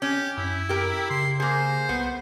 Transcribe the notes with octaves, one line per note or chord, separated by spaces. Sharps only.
C#4 G4
F#2 E4
G4 A#4
C#3 C6
A#3 G#4 C5
C2 B3